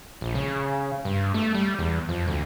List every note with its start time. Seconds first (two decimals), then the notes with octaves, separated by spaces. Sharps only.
0.21 A#1
0.35 C#3
1.05 G2
1.34 A3
1.55 G3
1.79 E2
2.09 F2
2.28 D2